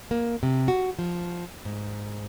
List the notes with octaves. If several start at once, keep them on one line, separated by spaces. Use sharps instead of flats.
A#3
C3
F#4
F3
G#2